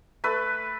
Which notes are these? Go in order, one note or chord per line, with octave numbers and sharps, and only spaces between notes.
A3 B4